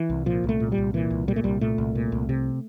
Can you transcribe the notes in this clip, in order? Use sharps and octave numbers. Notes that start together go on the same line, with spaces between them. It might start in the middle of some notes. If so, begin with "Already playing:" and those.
Already playing: E3
C2
A#2 F3
C2 A3
A#2
G3
C2
A#2 E3
C2
A#2 G3
A3
C2 G3
A#2 A3
C2
A#2
C2
C3